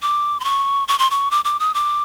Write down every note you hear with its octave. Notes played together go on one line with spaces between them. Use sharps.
D6
C6
C#6
C#6
C6
C#6
D6
D6
D#6
D6